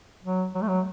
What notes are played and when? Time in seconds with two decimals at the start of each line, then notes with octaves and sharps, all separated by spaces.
0.23 F#3
0.55 F#3
0.62 A3
0.68 F#3